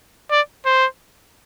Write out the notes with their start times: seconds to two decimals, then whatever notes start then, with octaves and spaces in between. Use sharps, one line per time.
0.31 D5
0.65 C5